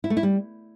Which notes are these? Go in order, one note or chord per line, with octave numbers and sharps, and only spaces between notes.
E4
A3
E4
G3